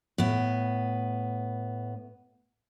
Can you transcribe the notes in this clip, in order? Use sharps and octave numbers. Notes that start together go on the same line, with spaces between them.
A2 B3